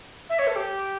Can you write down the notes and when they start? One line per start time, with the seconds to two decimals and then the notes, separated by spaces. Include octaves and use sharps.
0.29 E5
0.38 C#5
0.47 A4
0.55 G4